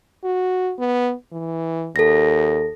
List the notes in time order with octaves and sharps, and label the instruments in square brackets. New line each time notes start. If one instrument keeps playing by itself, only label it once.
[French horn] F#4
B3
E3
[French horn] D#2 [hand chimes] A4 A#6